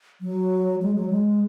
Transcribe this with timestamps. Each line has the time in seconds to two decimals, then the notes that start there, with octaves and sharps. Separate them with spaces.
0.21 F#3
0.82 G#3
0.96 F#3
1.10 G#3